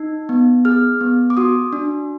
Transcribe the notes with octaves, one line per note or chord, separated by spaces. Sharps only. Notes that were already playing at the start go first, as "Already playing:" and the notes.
Already playing: D#4
B3
G#4 F6
B3
D6
F#4 D#6
D4